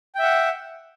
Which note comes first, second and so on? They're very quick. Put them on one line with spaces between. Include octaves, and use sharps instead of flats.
G5 E5 F#5